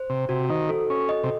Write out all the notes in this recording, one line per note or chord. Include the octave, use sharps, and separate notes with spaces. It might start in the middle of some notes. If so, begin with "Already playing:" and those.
Already playing: C5
C3
C3 F#4
D#3
A4
C#4
D#5
C3